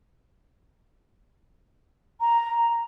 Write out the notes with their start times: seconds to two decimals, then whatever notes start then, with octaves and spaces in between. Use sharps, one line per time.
2.20 A#5
2.61 A#5